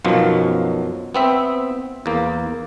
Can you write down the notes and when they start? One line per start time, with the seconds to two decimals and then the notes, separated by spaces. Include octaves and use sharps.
0.05 B1 F#2 B2 F3 F#3 F4
1.14 B3 C4 E5
2.06 E2 A#3